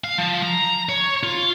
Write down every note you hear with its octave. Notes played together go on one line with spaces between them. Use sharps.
F5
F3
A#5
C#5
F4